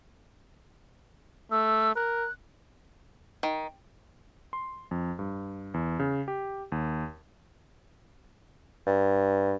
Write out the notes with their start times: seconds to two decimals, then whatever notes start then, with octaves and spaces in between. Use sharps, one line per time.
1.51 A3 E6
1.96 A#4 F#6
3.43 D#3
4.53 C6
4.91 F2
5.19 G2
5.74 E2
6.00 C#3
6.28 G4
6.72 D#2
8.87 G2